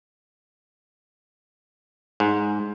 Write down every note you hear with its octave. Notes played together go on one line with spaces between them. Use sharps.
G#2